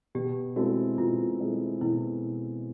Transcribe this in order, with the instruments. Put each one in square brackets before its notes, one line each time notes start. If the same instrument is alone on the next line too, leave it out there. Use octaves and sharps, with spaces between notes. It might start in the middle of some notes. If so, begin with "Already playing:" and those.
[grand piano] B2 [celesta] G4
[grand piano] G#3 C4 E4 A4 [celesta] F#4
[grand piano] B2 [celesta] F4
[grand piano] G#3 C4 E4 A4
[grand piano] B2 [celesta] E4